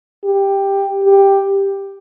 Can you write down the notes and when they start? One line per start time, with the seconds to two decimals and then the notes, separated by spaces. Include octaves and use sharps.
0.25 G4
1.04 G4